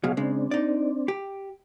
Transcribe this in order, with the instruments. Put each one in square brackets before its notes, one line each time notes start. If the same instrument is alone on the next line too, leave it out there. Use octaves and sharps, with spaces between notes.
[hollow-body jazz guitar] C#2 B2 F#3 [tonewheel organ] G#4 F5
[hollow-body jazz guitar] C#3 G#3 [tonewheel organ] C4 D4
[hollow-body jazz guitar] D#4 D5
G4